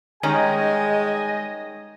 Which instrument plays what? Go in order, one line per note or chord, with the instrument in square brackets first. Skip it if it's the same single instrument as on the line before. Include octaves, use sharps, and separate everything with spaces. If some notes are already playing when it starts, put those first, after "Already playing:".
[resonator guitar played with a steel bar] D#3 G3 C#4 [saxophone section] G#3 [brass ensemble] G#4 G5 G#5 [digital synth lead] D#5